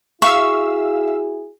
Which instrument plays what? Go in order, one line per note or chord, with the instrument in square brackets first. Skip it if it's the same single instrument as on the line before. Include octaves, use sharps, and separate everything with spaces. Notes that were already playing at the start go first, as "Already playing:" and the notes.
[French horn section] E4 F#4 G#4 [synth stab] E5 F5 E6 [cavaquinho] C#6